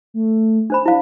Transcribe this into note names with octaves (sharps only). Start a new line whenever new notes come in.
A3
D4 C5 B5
D4 E4 F5